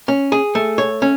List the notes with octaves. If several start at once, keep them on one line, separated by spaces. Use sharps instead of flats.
C#4
G#4
A3
C#5
C#4